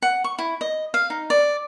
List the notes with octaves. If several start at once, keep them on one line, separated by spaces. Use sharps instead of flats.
F#5
C#6
E4
D#5
F5
D#4
D5